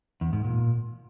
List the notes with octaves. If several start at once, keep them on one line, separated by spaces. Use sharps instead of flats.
E2
G#2
A#2